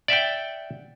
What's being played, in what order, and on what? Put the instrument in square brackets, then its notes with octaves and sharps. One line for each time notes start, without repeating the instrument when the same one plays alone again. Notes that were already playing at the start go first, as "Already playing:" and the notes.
[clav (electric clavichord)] D5 E5 F#5 G5